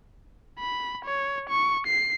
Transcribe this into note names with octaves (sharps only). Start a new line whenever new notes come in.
B5
C#5
C#6
C7